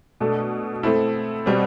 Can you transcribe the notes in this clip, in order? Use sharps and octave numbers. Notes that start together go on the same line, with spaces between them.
B2 A3 D4 A4
A3 C4 E4 A4
B2 G3 C4